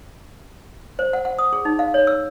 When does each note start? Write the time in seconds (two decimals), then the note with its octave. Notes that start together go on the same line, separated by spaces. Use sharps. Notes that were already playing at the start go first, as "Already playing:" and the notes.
0.99 C5
1.13 F#5
1.25 F#5
1.39 D#6
1.53 G#4
1.65 D#4
1.79 F5
1.94 C#5
2.07 E6